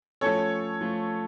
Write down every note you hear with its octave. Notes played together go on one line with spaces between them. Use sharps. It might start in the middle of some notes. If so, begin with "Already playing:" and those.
F3 A3 C#4 A4 C#5
F3 A3